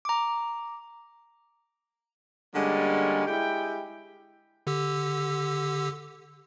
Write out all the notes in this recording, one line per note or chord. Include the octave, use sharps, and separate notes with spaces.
A#5 D6
D3 G3 G#3 A#3 C#4
G#3 E4 G4 G5
D3 G4 E6